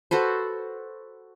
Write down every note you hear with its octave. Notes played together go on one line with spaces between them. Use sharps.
F#4 A4 B4 C5